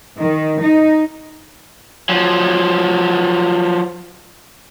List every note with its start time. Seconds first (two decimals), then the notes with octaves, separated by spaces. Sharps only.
0.21 D#3
0.62 D#4
2.09 F3 F#3